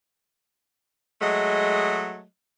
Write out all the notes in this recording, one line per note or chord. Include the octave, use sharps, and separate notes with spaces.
F#3 G#3 A3 D#5